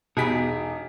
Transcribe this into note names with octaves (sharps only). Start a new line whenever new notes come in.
E1 B2 D#4 G4 G#4 B6